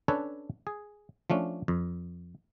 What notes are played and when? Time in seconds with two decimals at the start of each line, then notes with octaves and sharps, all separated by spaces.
0.08 C#4 D4 A4 B4 C#5
0.67 G#4
1.30 F3 A3 C#4 D4
1.68 F2